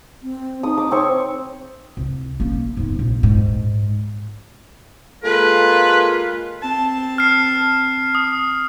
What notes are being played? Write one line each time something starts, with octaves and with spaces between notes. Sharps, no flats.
C4
D#4 D#6
D6
C4 C#5 C#6
C2
A#3 C#4
G#2 B3
A#1
G#2
G#3 A#3 F4 A4 B4
C4 A5
F6 C7
D#6